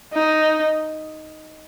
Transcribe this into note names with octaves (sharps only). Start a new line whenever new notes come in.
D#4